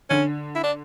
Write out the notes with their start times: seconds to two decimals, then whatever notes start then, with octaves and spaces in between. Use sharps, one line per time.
0.10 D3 C#4
0.55 E4
0.64 D4